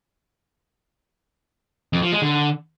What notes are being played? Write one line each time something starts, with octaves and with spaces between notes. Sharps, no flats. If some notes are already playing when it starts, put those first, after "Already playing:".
F2
F3
G#3
D3